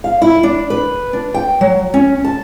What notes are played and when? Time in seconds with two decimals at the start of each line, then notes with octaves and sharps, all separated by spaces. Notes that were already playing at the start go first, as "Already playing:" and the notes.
0.04 F5
0.22 E4
0.43 D4
0.70 B4
1.13 D4
1.34 G5
1.61 F#3
1.94 C#4
2.25 A5